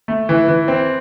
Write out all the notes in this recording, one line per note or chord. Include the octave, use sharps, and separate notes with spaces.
A3
E3
E3
C4